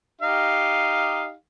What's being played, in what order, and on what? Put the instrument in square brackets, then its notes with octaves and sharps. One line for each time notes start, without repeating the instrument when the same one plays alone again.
[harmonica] D#4 G4 F5